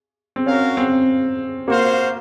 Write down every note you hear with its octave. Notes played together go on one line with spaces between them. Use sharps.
C4
C#4 F#4 A#4 F5
C4
A#3 F#4 C5 F5